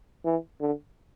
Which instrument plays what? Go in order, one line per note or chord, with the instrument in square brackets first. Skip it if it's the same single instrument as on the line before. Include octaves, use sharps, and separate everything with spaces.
[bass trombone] E3
D3